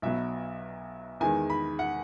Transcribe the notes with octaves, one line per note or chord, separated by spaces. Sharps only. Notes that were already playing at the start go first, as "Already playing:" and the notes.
B1 B2 F#3 B3 E5
E2 D#3 G#3 G#5
B5
F#5